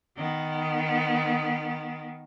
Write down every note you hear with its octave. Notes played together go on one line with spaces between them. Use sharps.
D#3 B3